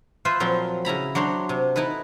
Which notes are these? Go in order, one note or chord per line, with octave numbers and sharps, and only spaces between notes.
F4 B4 C5 E5
A#2 F3 F#3 C4
C#3 E4 A#5 B5
F#3 D4 C5 C#5
C3
D#4 E4 A4 B4